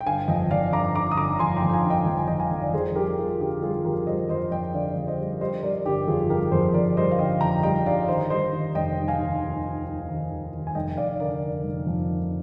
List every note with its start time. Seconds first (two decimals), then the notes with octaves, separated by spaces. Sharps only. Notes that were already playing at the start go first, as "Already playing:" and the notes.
0.01 G5
0.06 G1 F5 G#5
0.28 F2 D#5 G5
0.51 F2 D5 F5
0.73 G1 A#5 D6
0.95 G1 A#5 D6
1.12 D#6
1.17 D3 A#5 D6
1.39 F2 G#5 C6
1.56 G5 A#5
1.63 F2
1.69 G5
1.73 F5 G#5
1.84 G1
1.90 D#5 G5
2.06 F2 G5
2.17 G#5
2.28 F2 D#5 G5
2.40 F5 G#5
2.51 F2
2.62 D5
2.73 F2 G#4 C5
2.95 G3 G4 A#4
3.18 G3 F4 G#4
3.40 D3 G4
3.62 G3 F4 G#4
3.85 F2 G4 A#4
4.07 G3 C5 D#5
4.29 F2 C5 D#5
4.51 F2 D#5 G5
4.74 D3 D5 F5
4.96 F2
5.07 C5 D#5
5.19 G3
5.41 G3 C5 D#5
5.63 G3 A#4 D5
5.86 G1 G4
6.07 F2 F4 G#4
6.30 G3 G4 A#4
6.52 F2 G#4 C5
6.74 F2 A#4 D5
6.97 G3 C5 D#5
7.11 F5
7.19 D3 D#5 G5
7.41 F2 G5 A#5
7.63 G3 D#5 G5
7.85 D3 D5 F5
8.08 D#3 C5 D#5
8.30 G3 C5 D#5
8.53 D#3
8.75 F1 D#5 G5
8.97 G3
9.08 F5 G#5
9.19 D#2
9.41 D#3
9.64 D#2
9.86 D#2
10.08 D#3
10.31 D#2
10.54 D#3
10.67 G#5
10.75 F1 D#5 G5
10.97 F1 D5 F5
11.19 D3 A#4 D5
11.42 F1
11.64 F1
11.87 F2
12.09 F1